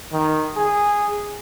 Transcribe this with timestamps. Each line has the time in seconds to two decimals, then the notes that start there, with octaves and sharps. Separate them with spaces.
0.13 D#3
0.57 G#4